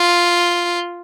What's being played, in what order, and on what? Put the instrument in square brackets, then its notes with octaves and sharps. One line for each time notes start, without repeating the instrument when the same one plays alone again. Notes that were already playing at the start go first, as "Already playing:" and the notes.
Already playing: [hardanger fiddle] F4